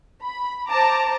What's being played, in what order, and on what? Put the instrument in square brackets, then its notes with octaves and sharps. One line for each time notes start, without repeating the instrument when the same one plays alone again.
[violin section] B5
C5 A5 A#5 D6